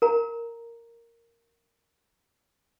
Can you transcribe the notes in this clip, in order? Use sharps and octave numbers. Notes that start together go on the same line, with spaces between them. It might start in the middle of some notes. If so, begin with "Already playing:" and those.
A#4 A#5